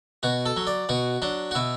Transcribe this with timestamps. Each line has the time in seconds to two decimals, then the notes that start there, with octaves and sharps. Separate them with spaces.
0.23 B2 F#4
0.46 A4
0.57 F#3
0.67 D5
0.89 B2 F#4
1.22 F#3 D4
1.51 F#4
1.55 B2 E4